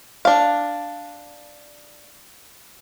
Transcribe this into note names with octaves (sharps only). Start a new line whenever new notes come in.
D4 F5